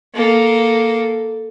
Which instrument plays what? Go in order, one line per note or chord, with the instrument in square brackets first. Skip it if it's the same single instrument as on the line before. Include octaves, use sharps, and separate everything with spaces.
[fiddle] A#3 A4